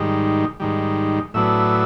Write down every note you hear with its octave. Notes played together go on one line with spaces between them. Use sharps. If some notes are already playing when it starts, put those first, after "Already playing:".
Already playing: G#2 D#3 G3
G#2 D#3 G3
A2 F#3 B3 D4 E5